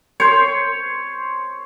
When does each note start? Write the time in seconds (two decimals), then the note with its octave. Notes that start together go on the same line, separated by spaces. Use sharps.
0.20 C5 C#5